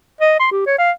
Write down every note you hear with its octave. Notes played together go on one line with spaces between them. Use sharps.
D#5
C6
G4
C#5
F5